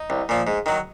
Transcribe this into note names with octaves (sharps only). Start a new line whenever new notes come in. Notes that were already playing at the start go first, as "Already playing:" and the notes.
Already playing: D#4
C2
A#2 F3
G#2
D#3 F#3